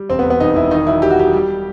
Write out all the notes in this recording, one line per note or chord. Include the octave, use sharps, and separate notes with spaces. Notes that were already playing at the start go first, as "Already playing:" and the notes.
Already playing: G3
E1 C4
B3
E1
B3
E1 D#4
E1 E4
D#3 D#4
F#3 E4
F#3 G4
F#4
F#3 G4
G3